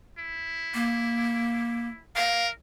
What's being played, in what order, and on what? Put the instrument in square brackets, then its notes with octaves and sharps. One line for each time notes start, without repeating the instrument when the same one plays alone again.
[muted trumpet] E4
[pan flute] A#3
[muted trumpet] A#4 [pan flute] F5